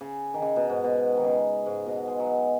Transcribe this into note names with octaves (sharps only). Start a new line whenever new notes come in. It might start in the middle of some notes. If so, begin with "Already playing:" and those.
C#3
D#3
C#3
B2
G#2
B2
D#3
C#3
G#2
B2
G#3
F#3
G#3